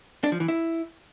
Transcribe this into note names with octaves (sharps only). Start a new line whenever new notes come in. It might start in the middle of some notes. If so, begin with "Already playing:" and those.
D4
F3
E3
E4